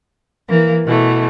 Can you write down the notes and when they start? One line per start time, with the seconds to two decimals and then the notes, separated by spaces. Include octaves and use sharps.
0.48 E3 A#3
0.84 B2 E3 A3